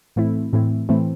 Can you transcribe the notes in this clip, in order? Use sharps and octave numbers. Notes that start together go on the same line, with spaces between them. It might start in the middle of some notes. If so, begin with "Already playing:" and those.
A2 E3 A3 C4 E4
A2 E3 A3 C4 E4
A2 E3 A3 C4 E4